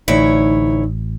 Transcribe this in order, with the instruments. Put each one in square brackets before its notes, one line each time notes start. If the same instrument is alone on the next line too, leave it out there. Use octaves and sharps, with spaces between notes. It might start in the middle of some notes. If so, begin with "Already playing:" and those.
[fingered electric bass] A1 [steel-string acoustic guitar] D2 E4 C#5 [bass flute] D#4